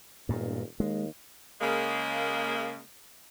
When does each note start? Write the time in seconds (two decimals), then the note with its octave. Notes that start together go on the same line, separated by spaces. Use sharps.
0.29 E1 G2 A#2
0.80 D#2 G#3
1.61 C#3 G#3 A#3